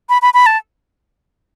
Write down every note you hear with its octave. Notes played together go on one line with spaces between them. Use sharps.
B5
B5
B5
A5